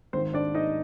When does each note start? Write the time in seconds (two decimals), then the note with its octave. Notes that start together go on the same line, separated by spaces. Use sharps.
0.13 G#1 G#2 D#3 C4 C5
0.34 D4 D5
0.55 D#4 D#5